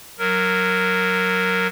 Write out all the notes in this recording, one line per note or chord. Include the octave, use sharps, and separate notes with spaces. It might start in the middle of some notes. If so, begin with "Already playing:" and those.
F#3 A#4